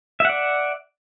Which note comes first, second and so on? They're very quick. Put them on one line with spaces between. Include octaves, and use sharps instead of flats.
E5 F#5 D5